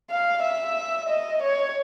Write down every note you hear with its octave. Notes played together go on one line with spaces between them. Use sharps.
F5
E5
D#5
C#5